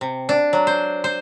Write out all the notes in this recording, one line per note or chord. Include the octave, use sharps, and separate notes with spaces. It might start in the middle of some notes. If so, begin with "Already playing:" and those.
C3
D4
F#3
C5
C5